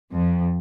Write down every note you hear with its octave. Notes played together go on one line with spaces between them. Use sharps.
F2